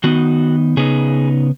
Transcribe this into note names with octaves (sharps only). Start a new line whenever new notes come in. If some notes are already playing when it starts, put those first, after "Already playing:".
D#3 B3 D#4 F#4
C#3 B3 D#4 G#4